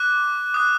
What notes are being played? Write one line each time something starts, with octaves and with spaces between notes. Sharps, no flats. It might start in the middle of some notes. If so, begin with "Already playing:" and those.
Already playing: D6 F#6
D#6 F#6